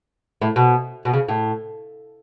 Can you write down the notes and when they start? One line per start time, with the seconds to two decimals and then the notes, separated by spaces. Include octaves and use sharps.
0.41 A2
0.56 B2
1.05 B2
1.13 C#3
1.28 A2